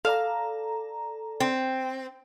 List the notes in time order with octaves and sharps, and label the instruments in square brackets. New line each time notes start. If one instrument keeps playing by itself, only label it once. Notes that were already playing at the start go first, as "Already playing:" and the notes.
[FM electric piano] A4 D5 A#5 [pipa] F5
[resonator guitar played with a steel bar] C4